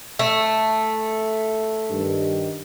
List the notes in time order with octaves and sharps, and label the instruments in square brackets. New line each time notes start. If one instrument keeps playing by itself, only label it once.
[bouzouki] A3
[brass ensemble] G2 D#3